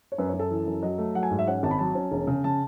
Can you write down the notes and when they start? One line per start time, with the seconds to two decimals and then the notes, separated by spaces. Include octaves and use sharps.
0.12 C#5
0.18 F#2 B4
0.29 F#2 C#5
0.39 A4
0.51 E3
0.66 F#2
0.83 F#3 D#5
0.98 A3
1.15 F#3 F#5
1.23 G#5
1.30 G#2
1.39 E5
1.47 C#4 F#5
1.63 G#1 A5
1.71 B5
1.79 F#3 A5
1.95 C#4
2.11 E1
2.27 C#3
2.44 C#3 A5